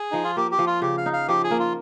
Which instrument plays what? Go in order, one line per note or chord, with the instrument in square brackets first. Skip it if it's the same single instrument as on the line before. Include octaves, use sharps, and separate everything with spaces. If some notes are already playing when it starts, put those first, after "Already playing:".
Already playing: [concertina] G#4
[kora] F3 [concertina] D#4
[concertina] F4
[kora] A#3 [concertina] G4
[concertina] G4
[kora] F3
[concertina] F4
[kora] C#3 [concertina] G4
[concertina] F5
[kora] D#4
[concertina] F5
[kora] F3 [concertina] G4
[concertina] G#4
[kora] A#3
[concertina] F4